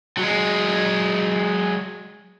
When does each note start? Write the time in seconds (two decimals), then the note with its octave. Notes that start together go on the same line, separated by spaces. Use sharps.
0.17 F#3 G#3